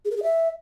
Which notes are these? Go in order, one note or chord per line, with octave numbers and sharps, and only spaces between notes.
G#4
A#4
G#4
E5